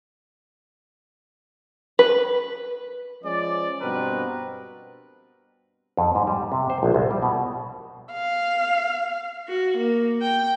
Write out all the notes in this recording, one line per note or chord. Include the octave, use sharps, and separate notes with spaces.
B4
F3 G#3 C#4 D5
G2 B2 C4 A#4 B4
F2
G#2
G3
C3
C5
A#1
C2
G3
B2
F5
F#4
A#3
G5